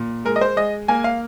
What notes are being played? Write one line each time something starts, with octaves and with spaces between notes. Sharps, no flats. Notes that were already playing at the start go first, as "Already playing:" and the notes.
Already playing: A#2
G#3 A#4
D#5
C5
G#3 D#5
A#3 G#5
F5